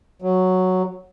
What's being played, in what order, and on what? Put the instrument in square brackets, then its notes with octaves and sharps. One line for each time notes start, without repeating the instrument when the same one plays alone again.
[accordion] F#3